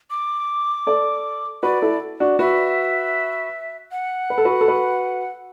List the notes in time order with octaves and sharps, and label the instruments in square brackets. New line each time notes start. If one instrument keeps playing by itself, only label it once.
[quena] D6
[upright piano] A4 D5
[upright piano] F#4 B4 [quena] D5
[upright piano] E4 A4
D4 F#4
[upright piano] F#4 B4 [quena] E5
[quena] F#5
[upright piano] B4
A4
F#4 B4
A4
F#4 B4